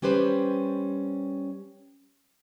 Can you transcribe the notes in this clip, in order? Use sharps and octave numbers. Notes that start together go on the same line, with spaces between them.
G3 C#4 G4 B4 C5